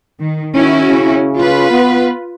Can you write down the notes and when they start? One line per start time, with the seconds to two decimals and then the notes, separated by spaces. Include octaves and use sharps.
0.20 D#3
0.54 D#3 C#4 E4 F#4
0.87 C#3
1.38 F4 B4
1.71 B3